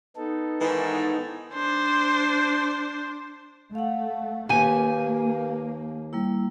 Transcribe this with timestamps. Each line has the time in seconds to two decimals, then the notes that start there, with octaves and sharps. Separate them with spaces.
0.17 B3 D#4 A4
0.60 G#2 D#3 E3
1.54 D4 C5
3.75 A3 F5 F#5
4.49 D#2 A#3 G4 B4 F5 G#5
6.13 G3 A#3 E4